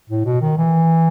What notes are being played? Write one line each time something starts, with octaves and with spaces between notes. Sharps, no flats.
A2
B2
D#3
E3